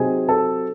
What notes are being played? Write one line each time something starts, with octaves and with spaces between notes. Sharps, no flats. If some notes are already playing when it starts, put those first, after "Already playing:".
Already playing: C3 F#3 C4 D#4 G#4 G#5
A4 A5